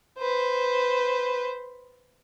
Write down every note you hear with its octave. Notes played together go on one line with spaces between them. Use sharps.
B4 C5